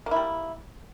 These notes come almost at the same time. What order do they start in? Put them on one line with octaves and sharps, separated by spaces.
A#3 E4 G3